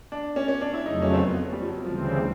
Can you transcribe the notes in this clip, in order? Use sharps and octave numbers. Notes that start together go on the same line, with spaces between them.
D4
C#4
C#4
D4
E4
F2 C#3 F#3 A3 D#4
C#4
C4
B3
G3
F3
F#3
D2 C#3 E3 F3 G3 C4